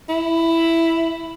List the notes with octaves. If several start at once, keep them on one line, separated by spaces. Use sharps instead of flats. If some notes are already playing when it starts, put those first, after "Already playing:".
E4